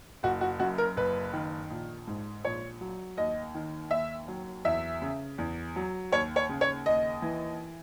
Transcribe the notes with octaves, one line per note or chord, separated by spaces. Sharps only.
F#1 F#4
F#4
F#2 F#4
A#4
F#1 B4
D#3
A#1
G#2
A#1 C#5
F#3
D#2 D#5
D#3
D#2 E5
F#3
E2 E5
C#3
E2
F#3
D#2 C#5
C#5
C#3
C#5
D#2 D#5
E3